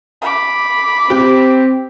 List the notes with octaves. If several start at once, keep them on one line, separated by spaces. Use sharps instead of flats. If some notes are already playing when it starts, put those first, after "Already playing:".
B5 D6
C4 G4